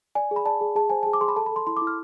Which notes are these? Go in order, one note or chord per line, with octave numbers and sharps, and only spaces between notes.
D5 G#5
G#4
B5
D5 A5
G#4
G#4 A5
C5 G#5
G#4 A5
D6
G#4 C6
B5
A4 A5
B5
A4 C6
E4 C6
D6
E4
F6